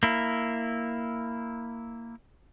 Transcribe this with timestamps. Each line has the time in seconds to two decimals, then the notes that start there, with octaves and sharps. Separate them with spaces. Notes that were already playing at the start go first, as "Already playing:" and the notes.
0.03 A#3 E4